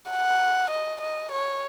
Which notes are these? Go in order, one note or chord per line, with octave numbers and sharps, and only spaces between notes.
F#5
D#5
D#5
C#5